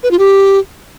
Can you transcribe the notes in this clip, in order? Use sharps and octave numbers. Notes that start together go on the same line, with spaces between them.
B4
F4
G4